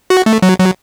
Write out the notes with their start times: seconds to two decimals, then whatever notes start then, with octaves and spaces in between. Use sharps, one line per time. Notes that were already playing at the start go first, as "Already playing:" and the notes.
0.10 F#4
0.26 A3
0.42 F#3
0.59 F#3